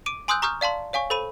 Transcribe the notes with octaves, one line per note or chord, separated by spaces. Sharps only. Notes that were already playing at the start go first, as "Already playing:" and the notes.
D6 D7 D#7
G#5 C6 D#6 E6 F#6 G6
A#5 C#6 D#6 F6 G6
D5 F5 A5 C6
C#5 F5 G#5 C#6
A4 C5 B5 D#7